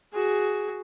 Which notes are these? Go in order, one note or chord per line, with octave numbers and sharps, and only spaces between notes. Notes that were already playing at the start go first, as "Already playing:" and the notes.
F#4 G#4